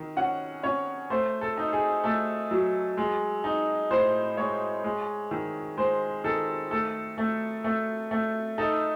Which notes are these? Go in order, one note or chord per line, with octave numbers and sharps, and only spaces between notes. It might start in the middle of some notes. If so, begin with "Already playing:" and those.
Already playing: D#3
C#4 F#5
C#4 C#5
A3 C5
A4
D#4
G#4
A3 A4
F#3
G#3
D#4
A2 C5
G#3 C#5
G#3
D#3
G#3 C5
D#3 A4
A3 A4
A3
A3
A3
D#4 A4